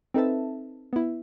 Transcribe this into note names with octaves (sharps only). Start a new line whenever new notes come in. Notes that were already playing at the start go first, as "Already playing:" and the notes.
C4 D#4 A4 B4 E5 A5
B3 E4